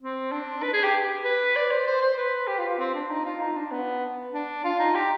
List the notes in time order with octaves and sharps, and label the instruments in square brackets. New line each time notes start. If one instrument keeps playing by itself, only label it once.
[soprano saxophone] C4
D4
B4
G#4
G4
B4
D5
C5
C5
C5
B4
G4
F4
F4
C4
D4
D#4
F4
D#4
D4
B3
D4
F4
D#4
G4